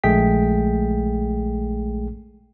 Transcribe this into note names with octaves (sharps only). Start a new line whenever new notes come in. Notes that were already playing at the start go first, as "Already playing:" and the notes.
A#1 G#3 A3 G#4 G5 B6